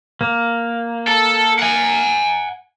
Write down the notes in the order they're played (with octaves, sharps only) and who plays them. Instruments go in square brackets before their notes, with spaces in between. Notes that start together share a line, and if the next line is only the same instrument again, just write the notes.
[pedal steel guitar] A#3
[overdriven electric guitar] A4
F#5 G#5